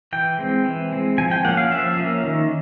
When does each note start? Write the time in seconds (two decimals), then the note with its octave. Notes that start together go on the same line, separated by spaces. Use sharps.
0.13 E3 G5
0.39 G#3 C4
0.65 E3
0.92 G#3 C4
1.18 F3 G#5
1.31 G5
1.45 A#3 C#4 F#5
1.57 F5
1.71 F3 E5
1.97 A#3 C#4
2.24 D#3